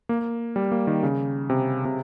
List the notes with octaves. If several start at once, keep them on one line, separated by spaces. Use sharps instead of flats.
A#3
G3
A#3
D#3
C#3
C3
C3